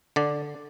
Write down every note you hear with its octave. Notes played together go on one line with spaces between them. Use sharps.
D3 D5